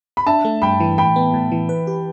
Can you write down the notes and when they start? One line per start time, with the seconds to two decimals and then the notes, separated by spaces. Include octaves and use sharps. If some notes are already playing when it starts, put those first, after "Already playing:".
0.17 B5
0.27 D4 E5 A5
0.45 A3
0.62 G2 G5 B5
0.80 E3
0.98 A2 G5 B5
1.16 B3
1.34 A2
1.52 E3
1.69 B4
1.87 G4